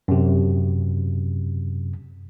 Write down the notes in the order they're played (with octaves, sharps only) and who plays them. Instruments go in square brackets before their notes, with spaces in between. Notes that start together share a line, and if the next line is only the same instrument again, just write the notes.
[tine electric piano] F#2 C3